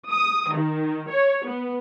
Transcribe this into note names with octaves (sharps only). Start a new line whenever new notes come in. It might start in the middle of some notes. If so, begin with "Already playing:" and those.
D#6
D#3
C#5
B3